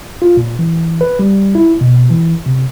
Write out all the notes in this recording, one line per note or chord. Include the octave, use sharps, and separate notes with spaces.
F4
A#2
E3
B4
G3
E4
B2
E3
C3